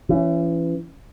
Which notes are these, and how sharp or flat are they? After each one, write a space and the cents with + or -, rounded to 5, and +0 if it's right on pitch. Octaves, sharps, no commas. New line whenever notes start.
E3 +30 C#4 +0